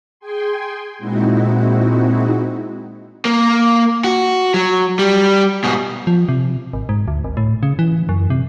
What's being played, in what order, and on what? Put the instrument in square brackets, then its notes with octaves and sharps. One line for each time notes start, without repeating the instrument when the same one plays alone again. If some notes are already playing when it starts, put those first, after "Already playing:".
[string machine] G#4 G5 G#5 C6
A#2 G#3 C4 D#4 E4 F#4
[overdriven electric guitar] A#3
F#4
F#3
G3
G#2 B2
[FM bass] F3
C3
G#1
G#2
D2
G#1
A2
C#3
E3
F#2
C3